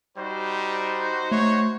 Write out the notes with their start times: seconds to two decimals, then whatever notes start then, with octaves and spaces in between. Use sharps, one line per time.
0.17 G3 D#4 F#4 C5
1.32 A3 C#5